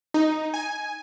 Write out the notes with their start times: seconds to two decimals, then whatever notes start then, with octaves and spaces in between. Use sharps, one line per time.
0.14 D#4
0.54 G#5